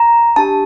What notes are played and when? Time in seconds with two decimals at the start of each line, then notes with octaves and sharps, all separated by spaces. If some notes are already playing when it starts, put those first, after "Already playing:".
Already playing: A#5
0.36 D4 G4 A5